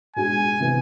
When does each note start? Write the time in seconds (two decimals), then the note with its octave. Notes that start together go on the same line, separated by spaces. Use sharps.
0.16 B2 G#3 D4 G#4 G#5
0.60 C3 E3 B3